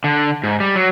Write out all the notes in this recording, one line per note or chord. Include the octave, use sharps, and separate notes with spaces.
D3
G#2
G3
F#3